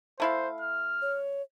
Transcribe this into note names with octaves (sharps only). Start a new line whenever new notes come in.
A3 E4 C5 F5
F6
C#5